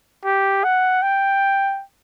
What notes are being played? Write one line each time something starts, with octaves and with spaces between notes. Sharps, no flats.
G4
F#5
G5